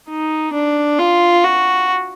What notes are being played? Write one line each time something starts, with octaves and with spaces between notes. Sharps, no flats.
D#4
D4
F4
F#4